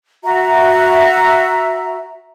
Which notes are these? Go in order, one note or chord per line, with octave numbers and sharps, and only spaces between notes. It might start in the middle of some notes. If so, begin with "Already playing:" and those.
F#4 E5 A#5